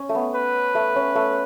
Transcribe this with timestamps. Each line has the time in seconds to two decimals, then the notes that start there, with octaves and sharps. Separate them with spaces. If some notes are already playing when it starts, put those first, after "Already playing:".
Already playing: C#4
0.09 A3
0.15 B3
0.35 B4
0.75 A3
0.96 C#4
1.15 A3